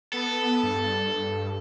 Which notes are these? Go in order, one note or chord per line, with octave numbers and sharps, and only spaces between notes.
B3 A4
G2